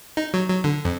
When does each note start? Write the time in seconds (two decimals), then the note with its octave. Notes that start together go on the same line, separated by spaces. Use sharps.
0.17 D#4
0.34 F#3
0.49 F#3
0.64 D3
0.85 F2